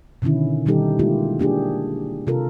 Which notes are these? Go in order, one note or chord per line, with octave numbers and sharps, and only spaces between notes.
B2 D3 D#3 C#4 E4
B2 D#3 G3 D#4 G4 A4
G#3 A#3 E4 F4 G4
A#3 D4 G4 G#4
C3 F4 A4 A#4